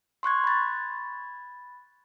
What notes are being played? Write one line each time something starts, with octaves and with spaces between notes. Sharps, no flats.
C6 C#6 F#6 G#6
B5 A6